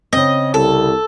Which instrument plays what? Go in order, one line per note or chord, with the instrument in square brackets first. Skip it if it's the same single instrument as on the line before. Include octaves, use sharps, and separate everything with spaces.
[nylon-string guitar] C#3 C4 [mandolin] D#5
[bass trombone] C2 [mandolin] A4